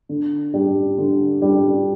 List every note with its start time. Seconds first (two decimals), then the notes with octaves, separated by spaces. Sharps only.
0.09 D3
0.54 G3 D4 G4
0.98 D3
1.42 G3 D4 G4